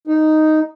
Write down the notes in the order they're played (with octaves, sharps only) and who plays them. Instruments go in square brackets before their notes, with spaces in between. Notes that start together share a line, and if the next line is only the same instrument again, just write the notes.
[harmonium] D#4